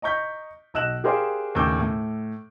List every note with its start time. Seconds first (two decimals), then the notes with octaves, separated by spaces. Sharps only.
0.02 D#5 A#5 C#6 G6 B6
0.74 B1 D#5 E6 F#6 E7 F#7
1.04 G4 G#4 A#4 C5 D5 F5
1.55 D#2 A2 C#3 D6 E6 G6
1.79 A2